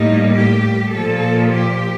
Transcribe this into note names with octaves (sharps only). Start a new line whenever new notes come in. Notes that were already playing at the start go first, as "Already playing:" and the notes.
Already playing: A2 G3 A#3 D#4
G4
A#2 F3 A#3 A4
G4